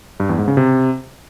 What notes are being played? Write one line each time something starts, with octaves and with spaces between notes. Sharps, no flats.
G2
E2
G#2
C#3
C3